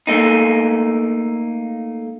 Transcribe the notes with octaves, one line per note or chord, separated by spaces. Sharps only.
A3 A#3 D#4